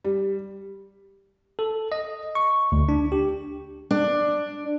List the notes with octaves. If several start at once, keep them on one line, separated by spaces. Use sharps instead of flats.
G3
A4
D#5
C#6
D2
D4
G4
D4